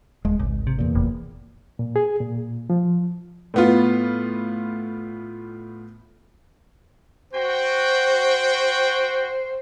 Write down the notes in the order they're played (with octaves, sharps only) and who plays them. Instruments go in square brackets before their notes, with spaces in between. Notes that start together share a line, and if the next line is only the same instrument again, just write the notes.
[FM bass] D#1 [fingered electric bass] G#3
[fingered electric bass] G#1 [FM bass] C#2
[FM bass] C3
[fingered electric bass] E2 A#2
[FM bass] F1
[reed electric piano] A#2
G#4
A#2
F3
[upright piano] A2 B3 F4
[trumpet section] F#4 G5 [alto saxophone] C5